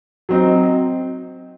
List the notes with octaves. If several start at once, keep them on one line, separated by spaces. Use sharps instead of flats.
F#3 C4 D#4